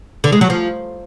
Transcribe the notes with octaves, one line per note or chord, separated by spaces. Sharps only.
D3
G#3
F#3
F3